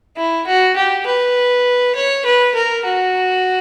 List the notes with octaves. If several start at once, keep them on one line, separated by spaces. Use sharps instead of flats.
E4
F#4
G4
B4
C#5
B4
A#4
F#4